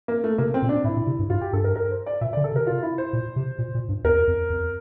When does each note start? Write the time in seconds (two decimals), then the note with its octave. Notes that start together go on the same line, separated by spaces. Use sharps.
0.08 A#3
0.24 A3
0.38 C3 A#3
0.54 C4
0.62 A#2
0.69 D4
0.84 A2 E4
0.96 A#2
1.07 C3
1.19 G2
1.30 G2 F4
1.41 G4
1.53 G2 A4
1.64 A#4
1.76 A#4
1.91 C5
2.06 D5
2.21 A#2 E5
2.33 D5
2.37 D3
2.44 A4
2.52 C3 A#4
2.67 F4
2.83 E4
2.98 C5
3.13 A#2
3.36 C3
3.58 A#2
3.74 A#2
3.89 G2
4.04 E2 A#4
4.27 F2
4.50 F2